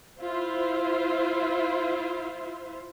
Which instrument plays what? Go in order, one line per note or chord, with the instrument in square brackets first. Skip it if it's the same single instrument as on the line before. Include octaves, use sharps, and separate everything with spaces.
[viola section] E4 F4 C5 E5